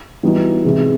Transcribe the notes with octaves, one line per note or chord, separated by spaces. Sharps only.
E3 G3 B3 D#4 F#4
C3 E3 G#3